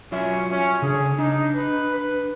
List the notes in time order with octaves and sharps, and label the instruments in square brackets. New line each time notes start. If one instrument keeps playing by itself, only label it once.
[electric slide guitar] F#3 F4 E5 [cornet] C#4
[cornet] C#4
[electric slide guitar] C#3 D4 [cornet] G#4
[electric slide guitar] D4 [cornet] D#4
[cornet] B4
B4